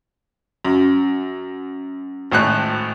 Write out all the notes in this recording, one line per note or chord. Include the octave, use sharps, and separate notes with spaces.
F#2
G#1 A2 F#6